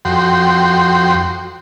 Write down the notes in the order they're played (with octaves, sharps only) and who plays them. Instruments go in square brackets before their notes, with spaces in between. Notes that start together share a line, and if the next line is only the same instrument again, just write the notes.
[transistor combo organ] F2 F#4 G5 C6